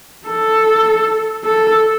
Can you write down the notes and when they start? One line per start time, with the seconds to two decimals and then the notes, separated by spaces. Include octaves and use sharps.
0.28 A4
1.44 A4